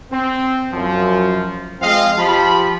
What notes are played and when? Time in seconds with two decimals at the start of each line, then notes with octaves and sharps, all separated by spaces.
0.11 C4
0.72 F#2 F3
1.81 F3 G#3 C4 D#5 F5
2.18 F3 G4 A5 B5